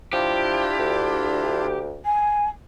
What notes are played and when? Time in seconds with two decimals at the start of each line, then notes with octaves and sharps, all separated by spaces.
0.13 F3 D4 E4 F4 G4
0.79 D2
2.05 G#5